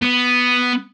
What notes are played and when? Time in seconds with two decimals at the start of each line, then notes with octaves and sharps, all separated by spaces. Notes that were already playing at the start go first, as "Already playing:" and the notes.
0.02 B3